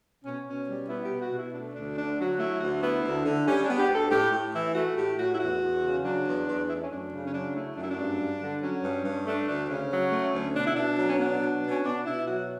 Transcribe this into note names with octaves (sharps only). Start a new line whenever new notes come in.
B2 C#4
B2 C#4
G3
B3 E4
G4
B2
F#4
B2
E4
A3 D4
D2 D4
D3 D4
F#3 F#4
A3 E4
D2 F#4
B3 E4
D2
D3
G3 C#4
B3 D4
G4
D2
A4
A2 G4
A2
E3 E4
A3 F#4
A2 G4
A2 F#4
E4
E2 F#4
E2
C#3
F#3 D4
E2
E2
A3 E4
D4
C#4
F#2 D4
C#3
C#4
F#3 D4
A3 E4
F#2 D4
E4
D4
G2
G2
D3
F#3 C#4
G2
G2
A3 D4
D2 D4
C#3 C#4
F#3
A3
D2
B2 D4
E4
B2 D4
F#3
C#4
B3 D4
B2
B2
C#4
B2 D4
B2 E4
F#3 F#4